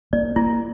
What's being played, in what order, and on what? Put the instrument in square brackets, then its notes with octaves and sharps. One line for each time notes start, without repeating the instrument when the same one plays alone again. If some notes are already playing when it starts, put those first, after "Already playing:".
[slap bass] A#3 [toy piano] D5
[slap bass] A#3 [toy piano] E4